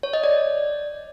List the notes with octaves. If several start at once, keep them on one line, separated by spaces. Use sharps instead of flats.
C#5
D#5
D5